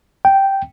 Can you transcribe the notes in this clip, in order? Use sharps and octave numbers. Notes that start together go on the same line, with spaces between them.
G5